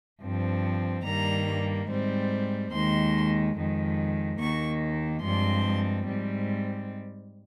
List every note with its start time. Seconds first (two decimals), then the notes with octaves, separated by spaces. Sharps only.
0.21 G2 F3 C4
1.04 G2 D#3 G3 A#3 A#5
1.89 G#2 G3 C4
2.72 D#2 D#3 G#3 C6
3.56 F2 D#3 G#3
4.39 D#2 D#3 A#3 C#6
5.23 G2 F3 G#3 C4 C6
6.08 G#2 G3 C4